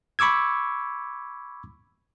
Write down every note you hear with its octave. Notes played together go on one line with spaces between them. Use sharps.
B5 C#6 D6 E6 G#6